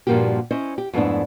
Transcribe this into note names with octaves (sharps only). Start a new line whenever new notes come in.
G2 A#2 F3 A#3 F#4 G4
C#4 E4 C5 D#5
G4
F2 G#2 A3 B3 D4 E4